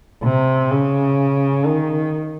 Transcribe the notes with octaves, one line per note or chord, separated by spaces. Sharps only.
C3
C#3
D#3